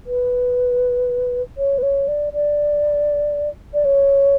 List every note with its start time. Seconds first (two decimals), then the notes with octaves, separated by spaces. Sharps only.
0.06 B4
1.58 C#5
1.78 B4
1.83 C#5
2.08 D5
2.33 D5
3.74 D5
3.85 C#5